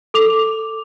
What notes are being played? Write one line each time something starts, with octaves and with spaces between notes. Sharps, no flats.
A4 D6 F7